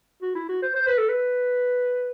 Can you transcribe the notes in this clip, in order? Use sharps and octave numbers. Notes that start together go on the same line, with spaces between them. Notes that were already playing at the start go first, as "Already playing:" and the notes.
F#4
E4
F#4
C5
C5
B4
A4
B4